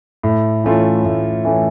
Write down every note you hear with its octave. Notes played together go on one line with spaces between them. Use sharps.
A2
E3 A3 C#4 F4
A2
E3 A3 C#4 F4